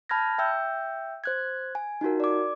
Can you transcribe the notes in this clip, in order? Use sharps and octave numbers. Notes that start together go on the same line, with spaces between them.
A5 B5 F6 G6 G#6 A#6
E5 G5 E6 G6
C5 F#6 G#6
G#5
D#4 F4 F#4 A#4
D5 D6